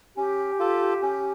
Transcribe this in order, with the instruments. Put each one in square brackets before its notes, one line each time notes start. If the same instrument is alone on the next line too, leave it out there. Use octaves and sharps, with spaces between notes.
[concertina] C#4 [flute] G4
[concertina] F4 A4
C#4